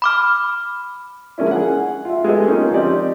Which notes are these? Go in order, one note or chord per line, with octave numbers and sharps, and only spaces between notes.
B5 D6 F6
F3 G#3 A#3 C#4 D4 E4
G#4 F#5
F4 E5
G#3 B3 G4 A4 D#5
A#3 C#4 D#4 F4
F3 C4 G4 D5 D#5